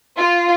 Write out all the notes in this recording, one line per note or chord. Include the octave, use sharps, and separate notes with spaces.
F4